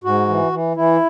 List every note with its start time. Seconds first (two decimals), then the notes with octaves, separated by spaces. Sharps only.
0.04 G#2 F#4
0.29 E3
0.52 E3
0.76 E3 E4